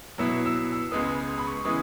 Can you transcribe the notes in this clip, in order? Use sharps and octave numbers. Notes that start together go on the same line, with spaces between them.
B2 F#3 B3 E4 E6
E6
E6
C#2 C#3 G#3 B3 D#6
D#6
B5
C#6
C#3 E3 G#3 B3 D#6